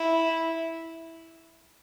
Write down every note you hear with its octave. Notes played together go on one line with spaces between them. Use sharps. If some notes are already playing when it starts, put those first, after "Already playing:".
Already playing: E4